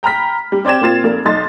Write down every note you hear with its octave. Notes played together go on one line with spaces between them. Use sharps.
G5 A#5 B5 F6 B6
G3
C4 D5 G5 G#6 E7
A#2 C4 F4 A6 E7
F1 A#3
B1 D#4 C6 A6